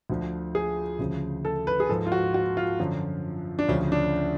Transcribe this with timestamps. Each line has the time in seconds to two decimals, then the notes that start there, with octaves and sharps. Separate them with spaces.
0.10 D2 D3 F3
0.55 G#4
0.99 D2 C#3 F3
1.45 A4
1.67 B4
1.80 G#4
1.89 G#2 F3 A4
2.07 F4
2.12 F#4
2.34 F#4
2.57 F4
2.79 F#2 D3 F3
3.59 D4
3.68 D2 C#3 F3 C#4
3.92 D4